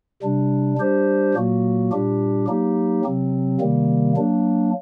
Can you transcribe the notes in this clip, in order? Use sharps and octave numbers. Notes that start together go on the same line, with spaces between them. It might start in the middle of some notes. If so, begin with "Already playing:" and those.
C3 G3 D4
G3 D4 G4 C5
A#2 F#3 A#3 F#4
A#2 G3 D4 G4
F#3 A#3 D#4 G4
C3 F#3 C4
C3 D#3 G3 A#3
F#3 A#3 D4